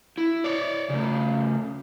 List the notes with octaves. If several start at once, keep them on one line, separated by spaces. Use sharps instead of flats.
E4
C#5 D5
C#3 A3